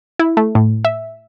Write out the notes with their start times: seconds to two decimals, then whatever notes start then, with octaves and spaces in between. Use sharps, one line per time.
0.19 E4
0.37 A3
0.55 A2
0.85 E5